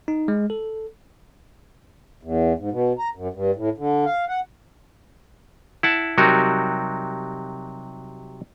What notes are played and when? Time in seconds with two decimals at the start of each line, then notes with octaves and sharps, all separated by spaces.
0.08 D#4
0.28 G#3
0.50 A4
2.23 E2
2.59 G#2
2.72 B2
2.98 A#5
3.15 F#2
3.34 G2
3.56 A2
3.78 D3
4.06 F5
4.29 F#5
5.83 E4 F#5 A5
6.18 C3 F#3 G3 D#4 F#4 A#4